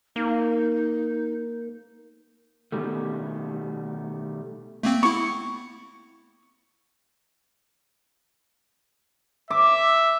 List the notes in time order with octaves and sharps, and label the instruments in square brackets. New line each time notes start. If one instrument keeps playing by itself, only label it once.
[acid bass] A#3 [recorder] D#4
[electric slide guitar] B2 D#3 G3 A3
[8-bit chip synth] A3 A#3 C4
[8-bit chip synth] B3 E4 [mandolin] C#6
[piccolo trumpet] E5 [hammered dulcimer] D6